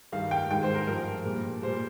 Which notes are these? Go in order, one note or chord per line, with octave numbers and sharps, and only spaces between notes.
G2 D#3 G3 F5
G5
G#2 D#3 G3 G5
C5
A#4
G2 F3 A#4
A#2 G3
A#2 G3 C5